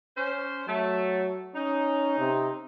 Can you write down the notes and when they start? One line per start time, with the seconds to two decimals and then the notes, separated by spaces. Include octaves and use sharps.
0.17 C#4 C5
0.68 F#3 A3
1.55 C#4 D#4
2.18 C3